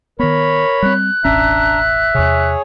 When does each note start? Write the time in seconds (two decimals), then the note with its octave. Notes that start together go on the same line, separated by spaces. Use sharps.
0.19 D#3 B3 A#4 C#5 B5
0.82 G3 C4 F#6
1.25 E1 A1 C#4 D4 E5 A#5
2.15 E2 C3 G#4 C#5